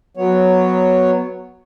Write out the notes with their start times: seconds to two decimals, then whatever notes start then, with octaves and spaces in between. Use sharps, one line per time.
0.17 F#3 B3 C#5